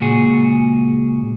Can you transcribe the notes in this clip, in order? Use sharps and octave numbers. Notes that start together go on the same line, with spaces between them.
C#2 A#2 F#4 G#4